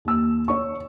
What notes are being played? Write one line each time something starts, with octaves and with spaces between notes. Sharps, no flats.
D#2 E6
C#5 C#6